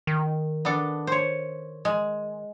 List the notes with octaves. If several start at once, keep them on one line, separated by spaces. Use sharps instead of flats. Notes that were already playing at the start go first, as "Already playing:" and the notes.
D#3
B3 D4 A4
C5 C#5
G#3